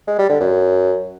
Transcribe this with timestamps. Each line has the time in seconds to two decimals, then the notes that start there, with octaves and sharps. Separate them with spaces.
0.08 G#3
0.19 G3
0.30 D3
0.41 F#2